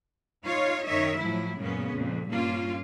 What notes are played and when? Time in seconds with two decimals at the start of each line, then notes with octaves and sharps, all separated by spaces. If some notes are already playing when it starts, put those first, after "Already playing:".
0.45 D#4 F4 C#5 F5
0.86 F#2 D#3 C#5 D#5 E5
1.19 A2 F3 F#3 E4
1.59 F#2 A#2 C#3 G#3 B3 C#4
1.93 F2 A#2
2.29 G2 A#3 C#4 F4